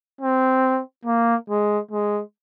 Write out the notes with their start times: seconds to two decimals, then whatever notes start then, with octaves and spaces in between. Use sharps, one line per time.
0.21 C4
1.05 A#3
1.49 G#3
1.91 G#3